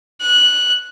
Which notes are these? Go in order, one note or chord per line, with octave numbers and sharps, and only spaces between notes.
F#6